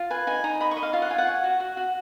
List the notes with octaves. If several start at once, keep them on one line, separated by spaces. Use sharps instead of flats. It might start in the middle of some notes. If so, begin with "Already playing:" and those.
Already playing: F4
B4 G#5
D#4 G#5
D#4 A#5
D#5 B5
C#6
D#5
F5
F4 F5
F#5
F4 G#5
F#5
C#5
F#4
F#4
F#4